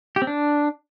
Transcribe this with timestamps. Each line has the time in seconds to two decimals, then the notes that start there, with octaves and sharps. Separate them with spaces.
0.16 G4
0.22 C4
0.27 D4